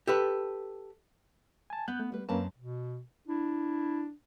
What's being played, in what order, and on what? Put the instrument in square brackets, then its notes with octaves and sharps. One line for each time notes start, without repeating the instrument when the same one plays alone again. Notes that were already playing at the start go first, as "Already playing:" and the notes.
[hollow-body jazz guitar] G4 A4 B4
[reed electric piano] G#5 A5
[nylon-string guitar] B3 [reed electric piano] F#6 G6
[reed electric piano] A3
[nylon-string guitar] G3 B4
[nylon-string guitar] F#2 C4 A5 [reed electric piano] A#3 C#4 B4
[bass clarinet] B2
[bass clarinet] D4 [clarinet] E4